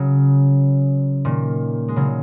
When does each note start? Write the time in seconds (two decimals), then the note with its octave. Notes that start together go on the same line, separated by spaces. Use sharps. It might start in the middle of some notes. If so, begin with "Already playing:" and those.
Already playing: C#3 F#3
1.25 A#2 D#3
1.88 G#3
1.96 C#3 F#3